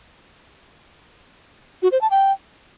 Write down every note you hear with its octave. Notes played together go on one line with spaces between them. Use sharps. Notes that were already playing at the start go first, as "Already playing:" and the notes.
F#4
C5
A5
G5